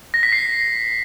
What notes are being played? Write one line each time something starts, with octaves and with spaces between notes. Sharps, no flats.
A#6
B6
C7